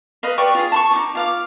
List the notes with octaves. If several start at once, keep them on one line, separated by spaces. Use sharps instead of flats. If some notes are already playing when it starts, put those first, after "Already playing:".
B4 D#5 F5
G4 B4 D5 C#6
F4 G#4
A5 C6 C#6
D#4 C#6 D6
F4 F5 D6